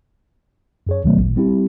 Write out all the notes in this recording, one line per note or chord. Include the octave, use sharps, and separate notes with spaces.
F#2 G#4 C#5
D2 B2 D#3 F#3 A3 B3
A1 A#2
G3 C4 E4 G4